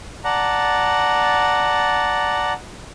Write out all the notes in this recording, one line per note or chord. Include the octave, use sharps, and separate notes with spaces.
D5 F#5 A5 A#5